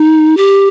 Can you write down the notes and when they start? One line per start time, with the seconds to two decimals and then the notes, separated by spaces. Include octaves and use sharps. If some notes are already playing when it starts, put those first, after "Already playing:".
Already playing: D#4
0.37 G4